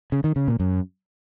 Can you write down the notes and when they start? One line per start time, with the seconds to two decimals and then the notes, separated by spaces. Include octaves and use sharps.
0.12 C#3
0.24 D#3
0.36 C#3
0.48 A#2
0.60 F#2